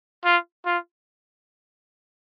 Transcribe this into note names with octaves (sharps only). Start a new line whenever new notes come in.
F4
F4